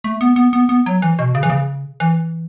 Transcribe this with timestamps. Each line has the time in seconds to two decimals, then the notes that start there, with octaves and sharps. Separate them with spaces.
0.04 A3
0.21 B3
0.36 B3
0.53 B3
0.69 B3
0.86 F#3
1.02 E3
1.19 B2
1.35 C#3
1.43 E3
1.50 C#3
2.00 E3